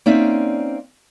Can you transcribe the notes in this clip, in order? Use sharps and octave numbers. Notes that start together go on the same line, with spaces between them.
A#3 C4 C#4 D#4 D5 E5